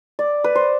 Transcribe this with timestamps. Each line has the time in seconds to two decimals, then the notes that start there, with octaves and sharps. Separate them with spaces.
0.19 D5
0.44 B4
0.55 C5